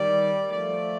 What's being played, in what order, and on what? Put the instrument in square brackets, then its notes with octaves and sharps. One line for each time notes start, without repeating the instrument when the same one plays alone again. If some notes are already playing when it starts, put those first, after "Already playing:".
Already playing: [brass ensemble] D#3 G3 [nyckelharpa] D5
[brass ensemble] F3 A3 [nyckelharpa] D5